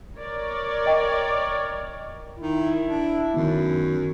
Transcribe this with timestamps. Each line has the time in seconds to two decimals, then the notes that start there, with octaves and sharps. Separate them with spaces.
0.16 A#4 C#5 D5
0.86 D#5 G5
2.39 D#3 E4
2.84 D4
3.34 F#2 D#3 B3